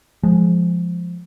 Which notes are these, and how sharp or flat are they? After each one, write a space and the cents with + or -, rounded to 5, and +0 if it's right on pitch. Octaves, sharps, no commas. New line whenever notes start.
F3 +0 G#3 +0